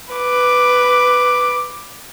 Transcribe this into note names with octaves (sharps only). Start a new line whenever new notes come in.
B4 D6